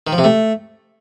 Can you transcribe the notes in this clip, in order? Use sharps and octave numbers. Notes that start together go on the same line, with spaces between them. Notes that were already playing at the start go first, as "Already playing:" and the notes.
D#3
F3
C3
A3